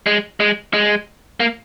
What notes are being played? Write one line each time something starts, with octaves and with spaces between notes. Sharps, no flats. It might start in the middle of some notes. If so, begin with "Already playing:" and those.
G#3
G#3
G#3
A#3